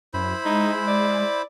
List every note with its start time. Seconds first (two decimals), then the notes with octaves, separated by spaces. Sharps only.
0.14 F#2 E4 C5 B5
0.45 G#3 D#4
0.87 D5